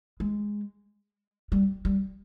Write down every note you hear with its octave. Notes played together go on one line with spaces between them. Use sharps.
G#3
G3
G3